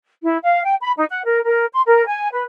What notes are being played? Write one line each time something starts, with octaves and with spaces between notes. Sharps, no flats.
E4
F5
G5
B5
D#4
F#5
A#4
A#4
C6
A#4
G#5
B4